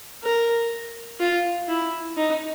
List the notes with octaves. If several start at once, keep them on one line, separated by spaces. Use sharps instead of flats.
A#4
F4
E4
D#4